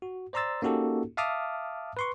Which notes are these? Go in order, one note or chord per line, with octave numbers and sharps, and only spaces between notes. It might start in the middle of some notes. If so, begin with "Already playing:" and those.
F#4
C5 D5 A#5 C6 E6 A6
A#3 C#4 D#4 F#4 G4 A4
E5 F5 A5 D6 D#6 F6
B4 C6 C#6